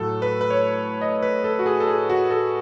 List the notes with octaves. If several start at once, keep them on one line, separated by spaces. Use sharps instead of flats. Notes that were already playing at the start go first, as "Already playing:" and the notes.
Already playing: A2 F#3 A3 A4
B4
B4
C#5
D#5
B4
A4
F#4
G#4
A4
G#4
F#4
A4